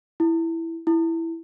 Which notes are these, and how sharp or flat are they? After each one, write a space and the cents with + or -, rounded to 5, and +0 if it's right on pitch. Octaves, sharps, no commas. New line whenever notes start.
E4 +0
E4 +0